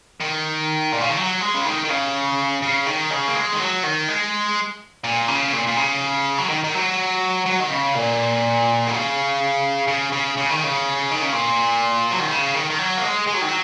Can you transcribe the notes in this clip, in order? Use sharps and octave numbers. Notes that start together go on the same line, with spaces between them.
D#3
A#2
C#3
D#3
F#3
G#3
C#3
D#3
D#3
C#3
C#3
D#3
C#3
A#3
G#3
D#3
F#3
D#3
G#3
A#2
C#3
A#2
A#2
C#3
F#3
D#3
D#3
F#3
F#3
D#3
C#3
A#2
D#3
C#3
C#3
C#3
C#3
D#3
C#3
D#3
C#3
A#2
F#3
D#3
C#3
D#3
D#3
F#3
A#3
G#3
G#3
F#3
D#3
F#3